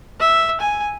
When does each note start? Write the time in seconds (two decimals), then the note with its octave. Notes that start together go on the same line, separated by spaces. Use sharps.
0.20 E5
0.61 G#5